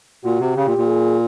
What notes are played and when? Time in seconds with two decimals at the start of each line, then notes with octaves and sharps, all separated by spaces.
0.24 A#2 F#4
0.40 C3
0.56 C#3 G4
0.67 A#2
0.78 A#2
0.88 G#4